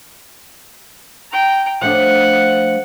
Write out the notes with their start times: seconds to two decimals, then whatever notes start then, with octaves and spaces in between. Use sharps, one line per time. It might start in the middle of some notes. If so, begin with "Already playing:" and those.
1.32 G5 A#5
1.81 F3 A3 D4 F#5